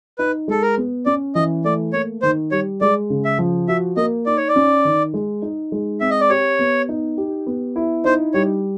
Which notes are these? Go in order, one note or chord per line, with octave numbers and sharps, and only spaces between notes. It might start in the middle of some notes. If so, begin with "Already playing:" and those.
D#4 B4
G#3 A4
A#4
B3
C#4 D5
E3 D#5
A3 D5
A#3 C#5
D#3 C5
G3 C#5
G#3 D5
C#3
E5
F3
F#4 E5
A#3 D#5
D#4 D5
C#5
D5
C#4
D#3
G#3
D#4
G#3
C4 E5
D#5
D5
G4 C#5
B3
D#4
G4
B3
E4
D#4 C5
G3 C#5